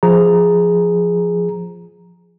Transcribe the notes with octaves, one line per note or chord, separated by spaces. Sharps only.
F3 G#4 A#5